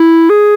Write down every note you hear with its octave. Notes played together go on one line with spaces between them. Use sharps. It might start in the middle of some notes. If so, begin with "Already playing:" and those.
Already playing: E4
G#4